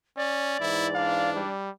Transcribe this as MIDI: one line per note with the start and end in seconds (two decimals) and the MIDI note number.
0.17 0.57 61
0.17 1.30 74
0.60 1.44 44
0.60 1.44 52
0.60 0.88 64
0.95 1.54 62
0.95 1.30 77
1.36 1.70 55